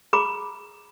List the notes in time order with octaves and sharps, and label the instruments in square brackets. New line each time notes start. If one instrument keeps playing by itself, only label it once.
[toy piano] G#4 A#5 B5 D6